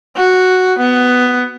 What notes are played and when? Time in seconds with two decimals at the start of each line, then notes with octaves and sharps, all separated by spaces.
0.16 F#4
0.79 B3